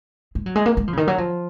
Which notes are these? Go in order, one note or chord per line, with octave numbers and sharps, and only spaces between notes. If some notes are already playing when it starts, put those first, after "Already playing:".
G#3
F#3
G#3
A#3
G#3
F3
C#3
D#3
F#3
F3